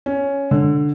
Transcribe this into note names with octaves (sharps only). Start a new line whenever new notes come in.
C#4
D3